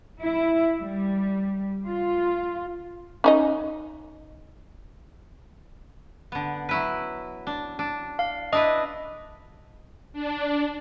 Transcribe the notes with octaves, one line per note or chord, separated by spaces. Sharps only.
E4
G3
F4
C#4 D#4 D#5
D3 B3
F#3 E4 B4
D4
D4
F5
D4 E4 B4 D#5 D#6
D4